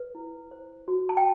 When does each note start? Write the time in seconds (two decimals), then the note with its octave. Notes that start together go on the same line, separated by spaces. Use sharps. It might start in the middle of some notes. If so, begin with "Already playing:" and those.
Already playing: B4
0.15 E4
0.51 C5
0.88 F#4
1.09 A5
1.17 G5